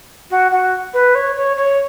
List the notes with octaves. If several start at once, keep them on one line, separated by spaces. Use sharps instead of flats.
F#4
F#4
B4
C#5
C#5
C#5